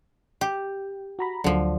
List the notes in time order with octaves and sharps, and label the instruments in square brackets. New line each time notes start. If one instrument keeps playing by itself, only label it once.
[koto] G4
[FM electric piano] F#4 A#5 B5
[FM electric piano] D2 F#3 [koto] D3 F3